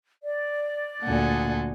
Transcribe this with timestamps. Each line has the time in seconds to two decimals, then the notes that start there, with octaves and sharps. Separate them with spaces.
0.24 D5
1.03 D2 A#2 A4 F#5 G#5